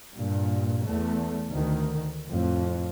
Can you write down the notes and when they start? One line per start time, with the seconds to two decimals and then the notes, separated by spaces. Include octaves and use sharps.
0.14 G2 A#2
0.84 E2 A3
1.49 D2 D#3
2.27 F2 A2